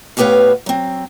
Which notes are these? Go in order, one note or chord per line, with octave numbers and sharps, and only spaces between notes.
A2 B3 G4 B4 C#5 F5
F#3 C4